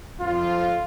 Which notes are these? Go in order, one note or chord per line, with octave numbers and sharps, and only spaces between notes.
F2 F4